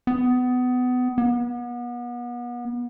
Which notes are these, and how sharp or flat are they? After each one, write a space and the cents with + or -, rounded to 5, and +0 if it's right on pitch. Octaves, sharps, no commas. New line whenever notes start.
B3 +20
B3 -35